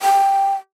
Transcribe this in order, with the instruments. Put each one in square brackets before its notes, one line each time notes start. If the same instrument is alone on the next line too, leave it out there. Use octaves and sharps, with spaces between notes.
[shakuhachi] G5